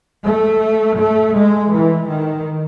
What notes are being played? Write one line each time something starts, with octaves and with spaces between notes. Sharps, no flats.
A3
A3
G#3
E3
D#3